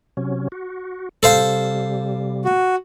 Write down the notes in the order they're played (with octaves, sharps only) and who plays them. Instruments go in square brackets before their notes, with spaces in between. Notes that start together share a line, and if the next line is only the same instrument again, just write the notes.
[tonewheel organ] C3 F#3 C#4
F#4
[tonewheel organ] C3 G3 [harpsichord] A4 C5 F5
[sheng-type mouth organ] F#4